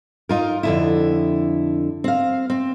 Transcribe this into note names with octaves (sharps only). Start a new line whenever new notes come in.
D#4 F4 A#4
F2 D3 E4
C4 F5
C4